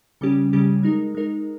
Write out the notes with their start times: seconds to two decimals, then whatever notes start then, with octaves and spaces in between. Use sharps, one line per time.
0.21 C#3 G3 C#4 G4
0.53 C#3 G3 C#4 G4
0.83 G#3 D#4 A#4
1.15 G#3 D#4 A#4